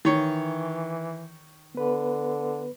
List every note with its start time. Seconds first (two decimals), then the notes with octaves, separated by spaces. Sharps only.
0.05 D#3 E3 C#5
1.75 D3 B3 B4